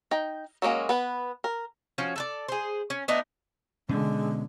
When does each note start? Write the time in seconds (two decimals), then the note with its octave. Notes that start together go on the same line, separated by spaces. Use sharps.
0.11 D#4 G5
0.62 F#3 G#3 A#3 C#4
0.89 B3 B4
1.44 A#4
1.98 F3 C#4 F#4
2.16 A4 B4 D5
2.48 G#4 C5
2.90 C#4
3.08 A3 B3 D4 D#4
3.89 B2 D3 G#3 C#4